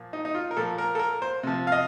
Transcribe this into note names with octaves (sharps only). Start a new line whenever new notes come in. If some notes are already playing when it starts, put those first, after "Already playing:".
Already playing: A#2 F3
D#4
D#4
F4
A#4
A#2 F3 A4
A#4
A4
A#4
C5
C3 F3
F5
D#5